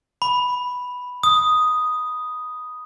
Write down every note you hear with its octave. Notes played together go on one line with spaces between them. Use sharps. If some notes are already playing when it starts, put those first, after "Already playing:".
B5
D#6